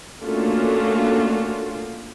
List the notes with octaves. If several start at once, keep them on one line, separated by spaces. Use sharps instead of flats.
A3 A#3 C#4 D4 F4 F#4